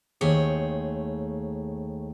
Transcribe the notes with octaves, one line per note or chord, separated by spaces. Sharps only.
D#2 A3 G#4 C5 C#5